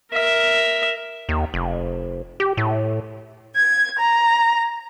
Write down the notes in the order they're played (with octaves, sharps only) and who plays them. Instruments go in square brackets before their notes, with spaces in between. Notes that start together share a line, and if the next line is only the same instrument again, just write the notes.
[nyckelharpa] A#4 E5
[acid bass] D#2
F1
G4
A2
[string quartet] G#6
A#5